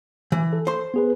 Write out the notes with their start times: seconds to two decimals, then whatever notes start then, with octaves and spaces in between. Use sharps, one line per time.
0.32 E3
0.53 A4
0.67 C5 C6
0.94 B3 G#4 B4